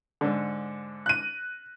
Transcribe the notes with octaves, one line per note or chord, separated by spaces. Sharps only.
G#2 D3
F#6 D#7